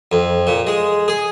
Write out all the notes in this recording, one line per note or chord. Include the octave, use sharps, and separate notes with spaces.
F2
A#2
G#3
G#4